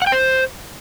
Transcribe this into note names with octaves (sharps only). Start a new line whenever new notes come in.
F#5
G5
C5